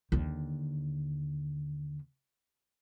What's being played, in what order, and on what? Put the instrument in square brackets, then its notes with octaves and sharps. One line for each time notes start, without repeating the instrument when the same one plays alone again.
[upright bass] D#2 D3